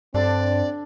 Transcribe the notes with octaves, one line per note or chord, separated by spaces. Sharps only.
G2 D3 C4 D4 A4 D5